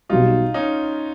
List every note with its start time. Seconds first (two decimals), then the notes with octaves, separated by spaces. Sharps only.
0.09 B1 B2 G3 D#4 F4
0.54 C#4 D#4